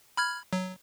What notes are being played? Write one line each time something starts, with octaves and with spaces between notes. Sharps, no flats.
B5 F6 G#6
F#3